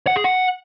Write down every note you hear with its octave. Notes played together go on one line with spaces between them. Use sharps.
F#5
G#4
F#5